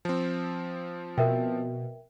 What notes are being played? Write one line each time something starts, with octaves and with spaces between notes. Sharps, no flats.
F3 C4
B2 A#4 E5 G5